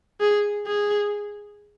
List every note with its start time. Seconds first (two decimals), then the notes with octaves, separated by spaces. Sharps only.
0.20 G#4
0.67 G#4